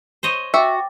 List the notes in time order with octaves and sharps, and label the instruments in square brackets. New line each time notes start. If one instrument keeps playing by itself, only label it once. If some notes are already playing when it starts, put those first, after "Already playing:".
[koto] C5 C#5 D#5
[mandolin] F#4 [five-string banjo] E5 [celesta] G5 D6 A6